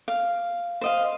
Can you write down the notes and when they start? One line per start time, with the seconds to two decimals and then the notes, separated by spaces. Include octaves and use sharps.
0.08 F5
0.81 C5 D#5 F5